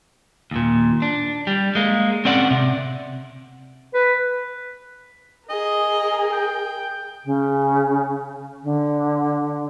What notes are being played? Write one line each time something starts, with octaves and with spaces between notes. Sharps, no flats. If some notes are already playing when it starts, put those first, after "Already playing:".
D#2 A#2
D4
G3
G#3 A#3
C4 C#4 D5 F#5
C3
B4
G#4 A#4 D#5
G5
C#3
D3